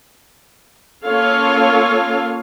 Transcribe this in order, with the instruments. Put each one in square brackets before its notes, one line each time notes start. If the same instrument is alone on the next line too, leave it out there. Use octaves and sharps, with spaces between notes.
[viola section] A#3 C#4 F4 A4 C#5 F5